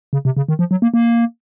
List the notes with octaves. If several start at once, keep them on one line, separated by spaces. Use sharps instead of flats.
C#3
C3
C#3
D#3
F3
F#3
A#3
A#3